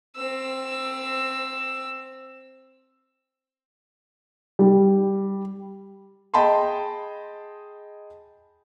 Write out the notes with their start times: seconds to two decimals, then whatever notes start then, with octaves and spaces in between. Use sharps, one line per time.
0.16 C4 E6
4.59 G3
6.34 G#4 D#5 G5 A5 B5 C6